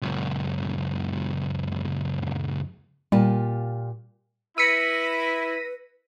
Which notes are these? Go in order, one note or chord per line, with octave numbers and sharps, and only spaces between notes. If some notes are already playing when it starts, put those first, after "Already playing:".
C#2 F#2
A#2 G3 F4 G4
E4 B4 E6 A#6 B6 C#7 D#7